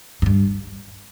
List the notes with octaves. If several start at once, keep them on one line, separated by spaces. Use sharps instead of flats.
G#2
G2